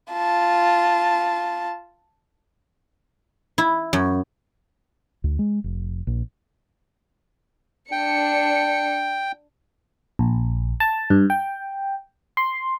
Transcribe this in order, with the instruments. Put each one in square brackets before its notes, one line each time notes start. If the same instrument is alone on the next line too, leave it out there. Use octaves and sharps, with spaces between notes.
[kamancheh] F4 A5
[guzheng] E4
F#2
[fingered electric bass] D2
G#3
F1
A#1
[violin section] D4 C#7 [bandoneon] G5
[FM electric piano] A#1
A5
G2
G5
C6